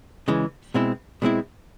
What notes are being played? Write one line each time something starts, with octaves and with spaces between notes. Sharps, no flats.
C#3 E3 G#3
B2 G#3 C4 E4
B2 G#3 C4 E4